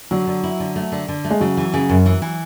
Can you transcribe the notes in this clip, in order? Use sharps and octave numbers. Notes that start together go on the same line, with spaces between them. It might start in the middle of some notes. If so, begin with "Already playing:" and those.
D3 F#3
D3
E4
D3
A3
D3
D3
A3
G#3
C#3 F#3
E3
C#3
F#2
E3
E3